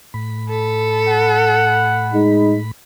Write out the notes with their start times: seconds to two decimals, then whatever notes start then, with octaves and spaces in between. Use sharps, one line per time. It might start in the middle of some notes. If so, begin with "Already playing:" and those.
0.14 A2 B5
0.49 A4
1.08 F#5
2.13 G#3 D#4